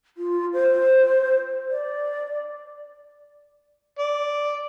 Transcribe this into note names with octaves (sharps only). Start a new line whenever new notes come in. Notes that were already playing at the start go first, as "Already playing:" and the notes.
F4
C5
D5
D5